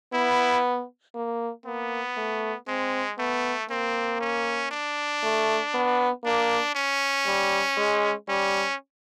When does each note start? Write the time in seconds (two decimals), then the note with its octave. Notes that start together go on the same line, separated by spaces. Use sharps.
0.13 B3 E4
1.15 A#3
1.65 A#3 B3
2.17 A3
2.68 G#3 C4
3.18 A3 B3
3.70 A#3 C4
4.21 C#4
4.71 D4
5.23 A3
5.74 B3
6.24 A#3 D4
6.75 C#4
7.26 G3
7.77 G#3
8.28 G3 C#4